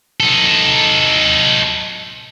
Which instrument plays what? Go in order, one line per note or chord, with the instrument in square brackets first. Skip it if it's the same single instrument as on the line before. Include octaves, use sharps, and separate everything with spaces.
[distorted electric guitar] D#4 A4